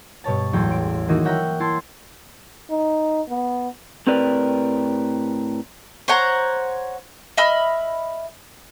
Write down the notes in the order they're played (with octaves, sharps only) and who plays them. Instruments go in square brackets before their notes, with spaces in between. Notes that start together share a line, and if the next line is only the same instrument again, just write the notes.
[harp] G2 B2 C#5 A5
A1 E2 F#3 G#3 G5
D7
D#3 E3 A#3 D#4 F#4
C#5 E5 F#5 G5 A#5
E4 A5 C6
[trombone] D#4
B3
[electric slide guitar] A2 C4 G4 A#4 B4 D5
[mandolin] C5 C#5 F#5 A#5
D#5 E5 B5 F6